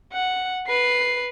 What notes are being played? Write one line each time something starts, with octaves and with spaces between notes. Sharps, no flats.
F#5
B4 C7